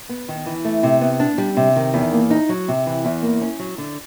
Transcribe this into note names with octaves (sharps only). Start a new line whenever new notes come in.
B3
D#3
E3
A3
C3
B3
D4
G3
C3
D#3
E2
A#3
D#4
F#3
C3
E3
E2
A#3
C#4
F#3
D3